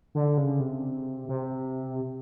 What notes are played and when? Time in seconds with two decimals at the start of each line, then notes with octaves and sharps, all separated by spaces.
0.15 D3
0.38 C#3
0.60 C3
1.29 C3